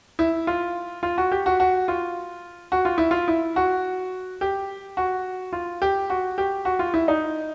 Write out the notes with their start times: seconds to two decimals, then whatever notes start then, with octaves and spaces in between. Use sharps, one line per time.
0.19 E4
0.47 F4
1.03 F4
1.18 F#4
1.31 G4
1.46 F#4
1.60 F#4
1.88 F4
2.72 F#4
2.85 F4
2.98 E4
3.11 F4
3.28 E4
3.56 F#4
4.41 G4
4.97 F#4
5.53 F4
5.82 G4
6.10 F#4
6.38 G4
6.65 F#4
6.79 F4
6.94 E4
7.08 D#4